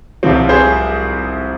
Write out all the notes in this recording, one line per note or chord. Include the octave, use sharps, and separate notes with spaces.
C2 C3 F3 C4
G#4 C5